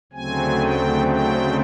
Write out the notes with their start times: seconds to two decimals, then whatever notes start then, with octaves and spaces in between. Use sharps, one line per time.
0.12 D2 C#3 F#3 A3 C4 G#5
0.60 G5
1.07 G5